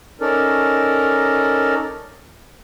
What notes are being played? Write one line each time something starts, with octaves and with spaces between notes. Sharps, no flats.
C#4 D#4 A4 A#4 D5